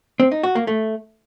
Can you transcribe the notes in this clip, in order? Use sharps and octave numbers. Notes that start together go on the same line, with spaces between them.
C4
D#4
F#4
A#3
A3